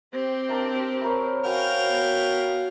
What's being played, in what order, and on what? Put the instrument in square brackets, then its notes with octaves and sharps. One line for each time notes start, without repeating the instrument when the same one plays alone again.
[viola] C4 G4 [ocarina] C5
[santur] D4 A#4 E5
E4 A#4 C#5
[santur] C#4 F#4 B4 [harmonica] A#4 F5 G5
[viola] B3